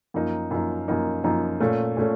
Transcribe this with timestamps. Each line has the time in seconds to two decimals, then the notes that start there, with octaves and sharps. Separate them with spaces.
0.14 F#2 F3 A#3 D#4
0.51 F#2 F3 A#3 D#4
0.88 F#2 F3 A#3 D#4
1.24 F#2 F3 A#3 D#4
1.60 A#2 A3 C#4
1.97 A#2 A3 C#4